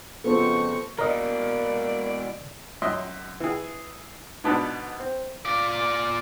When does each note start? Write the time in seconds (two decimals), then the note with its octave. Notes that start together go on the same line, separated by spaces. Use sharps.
0.24 F2 C#3 B3 F4 F#4 A4 C5 C#6
0.99 B2 E3 A#3 A#4 D5 D#5
2.82 F#2 C#4 D#5 E5 C6
3.40 E3 G#4
4.44 G#2 B2 B3 D4
5.00 C4
5.45 F4 D5